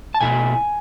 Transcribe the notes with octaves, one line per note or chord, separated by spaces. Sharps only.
A5
B2 A3 E4 G#5